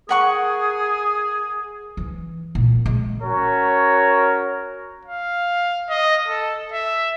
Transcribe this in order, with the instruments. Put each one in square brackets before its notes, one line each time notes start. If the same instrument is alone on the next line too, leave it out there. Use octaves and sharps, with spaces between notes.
[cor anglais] G#4 [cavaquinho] A#4 F#5 C#6
[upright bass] E3
A#2
G#3
[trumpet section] C#4 F#4 A#4 C#5
[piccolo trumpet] F5
D#5
A4
E5